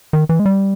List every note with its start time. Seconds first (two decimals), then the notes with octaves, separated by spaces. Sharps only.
0.13 D#3
0.29 E3
0.39 G#3
0.46 G3